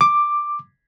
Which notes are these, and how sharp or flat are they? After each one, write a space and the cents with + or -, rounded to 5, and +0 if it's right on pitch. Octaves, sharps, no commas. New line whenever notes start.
D6 +10